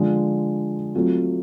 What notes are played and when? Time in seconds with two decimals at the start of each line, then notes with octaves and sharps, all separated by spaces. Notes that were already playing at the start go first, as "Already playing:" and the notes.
Already playing: D3 F3 G#3
0.95 F#3 A3 C4 F4